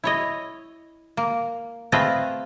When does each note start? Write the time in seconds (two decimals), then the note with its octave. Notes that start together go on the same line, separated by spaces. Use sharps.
0.04 E4 C#5 D#5
1.17 A#3
1.92 A3 C4 F4 G#4 B4 D#5